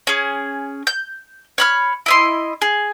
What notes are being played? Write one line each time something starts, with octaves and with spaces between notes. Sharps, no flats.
C#4 G#4
G6
C#5 B5 F6
E4 D#5 C6
G#4